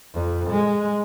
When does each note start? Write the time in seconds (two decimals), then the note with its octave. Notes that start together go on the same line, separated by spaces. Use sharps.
0.14 F2
0.50 G#3